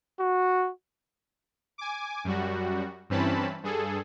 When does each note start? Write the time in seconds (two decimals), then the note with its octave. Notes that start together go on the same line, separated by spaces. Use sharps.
0.20 F#4
1.78 G#5 D6
2.24 F#2 G3 F#4
3.10 G2 E3 C4 C#4 A5 B5
3.63 G2 G#4 A4